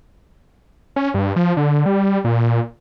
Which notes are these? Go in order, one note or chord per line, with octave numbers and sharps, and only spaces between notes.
C#4
G2
F3
D3
G3
A#2